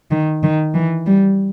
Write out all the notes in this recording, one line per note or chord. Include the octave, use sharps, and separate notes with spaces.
D#3
D#3
E3
G3